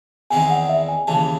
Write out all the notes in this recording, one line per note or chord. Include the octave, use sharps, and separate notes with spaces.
E2 D#3 G#3 C4 D#4 G#5
F#5
E5
G#5
D#2 C#3 E3 A5